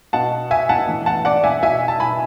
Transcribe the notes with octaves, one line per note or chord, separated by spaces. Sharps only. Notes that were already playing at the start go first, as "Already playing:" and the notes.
B2 F#5 A5
E5 G#5
F#5 A5
A2 E3
F#5 A5
D5 F#5
E5 G#5
B2 E5 G#5
A5
G#5 B5